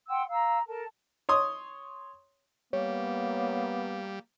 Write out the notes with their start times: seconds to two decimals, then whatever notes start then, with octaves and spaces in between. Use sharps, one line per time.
0.09 F#5 G5 C6 E6
0.28 F5 A#5 E6
0.66 A4 A#4 A5
1.29 C#5 C6 D#6
2.73 G3 A#3 B3 C#5